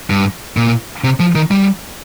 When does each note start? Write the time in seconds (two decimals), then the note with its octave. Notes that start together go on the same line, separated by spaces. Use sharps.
0.10 G2
0.57 A#2
1.04 C3
1.20 F3
1.35 D#3
1.51 G3